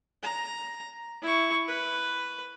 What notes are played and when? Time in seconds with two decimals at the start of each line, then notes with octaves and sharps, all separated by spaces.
0.23 A#5
1.22 E4 C#6
1.68 B4